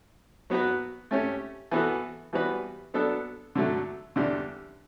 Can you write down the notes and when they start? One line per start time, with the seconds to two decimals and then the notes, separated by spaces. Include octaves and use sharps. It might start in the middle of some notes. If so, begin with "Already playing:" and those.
0.50 F#3 B3 F#4 B4
1.11 A3 C#4 G4 C#5
1.71 E3 B3 F#4 A4
2.33 E3 G3 B3 F#4 B4
2.94 F#3 B3 D4 A4
3.55 D3 F#3 A3
4.16 E2 D3 G3 D4 G4